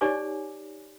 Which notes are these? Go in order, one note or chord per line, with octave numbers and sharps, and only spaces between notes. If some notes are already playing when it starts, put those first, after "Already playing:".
D#4 G4 C#5 D5 G#5 D6